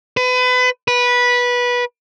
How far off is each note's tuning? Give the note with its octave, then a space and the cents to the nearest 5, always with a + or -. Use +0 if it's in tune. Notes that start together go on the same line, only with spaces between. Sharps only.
B4 +30
B4 -15